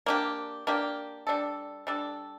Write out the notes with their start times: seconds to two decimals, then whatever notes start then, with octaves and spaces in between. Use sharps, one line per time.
0.06 A#3 D4 G4
0.67 A#3 D4 G4
1.27 G3 D4 A4
1.87 G3 D4 A4